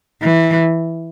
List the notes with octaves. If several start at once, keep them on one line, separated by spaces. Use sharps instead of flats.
E3